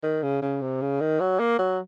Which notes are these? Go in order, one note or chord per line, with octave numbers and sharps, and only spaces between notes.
D#3
C#3
C#3
C3
C#3
D#3
F#3
A#3
F#3